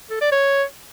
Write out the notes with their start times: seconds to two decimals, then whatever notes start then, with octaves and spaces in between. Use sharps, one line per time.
0.11 A4
0.21 D5
0.32 C#5